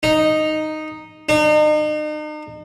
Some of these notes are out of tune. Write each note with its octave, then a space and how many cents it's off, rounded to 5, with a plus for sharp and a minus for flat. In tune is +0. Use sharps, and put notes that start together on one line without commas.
D#4 -5
D#4 -40